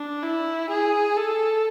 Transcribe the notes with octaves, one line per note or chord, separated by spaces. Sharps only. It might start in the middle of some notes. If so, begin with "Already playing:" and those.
Already playing: D4
E4
G#4
A4